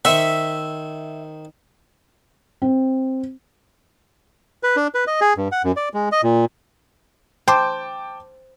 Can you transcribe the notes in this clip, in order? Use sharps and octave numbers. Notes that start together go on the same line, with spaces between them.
D#3 C5 E5 C#6
C4
B4
D4
B4
D#5
G#4
G2
F#5
F#2
D5
G#3
D#5
A#2
C5 G5 A5 D6